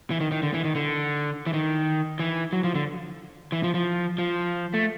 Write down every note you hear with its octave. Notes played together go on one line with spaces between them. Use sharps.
E3
D#3
D#3
D3
E3
D#3
D3
E3
D#3
E3
F#3
F3
D3
E3
F3
F3
F3
A3